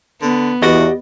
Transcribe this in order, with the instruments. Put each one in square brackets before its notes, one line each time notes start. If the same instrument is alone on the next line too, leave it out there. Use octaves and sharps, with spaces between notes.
[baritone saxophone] D3 [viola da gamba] B3
[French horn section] E2 [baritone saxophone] F#4 [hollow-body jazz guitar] G4 D5 D#5